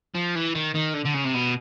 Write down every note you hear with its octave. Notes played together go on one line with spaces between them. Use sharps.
F3
E3
D#3
D#3
D3
D3
C#3
C3
B2